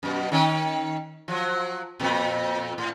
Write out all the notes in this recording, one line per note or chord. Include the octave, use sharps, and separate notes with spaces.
F#2 B2
D#3 C#4
F3 F#3
F2 A#2
A2